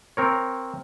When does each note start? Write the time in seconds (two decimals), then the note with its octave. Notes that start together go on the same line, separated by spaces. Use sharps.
0.17 C4 A#4 C#5